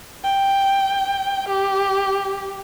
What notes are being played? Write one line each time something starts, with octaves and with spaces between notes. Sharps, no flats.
G5
G4